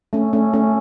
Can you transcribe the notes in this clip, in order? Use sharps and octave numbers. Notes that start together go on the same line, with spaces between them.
A3 C#4
A3 C#4
A3 C#4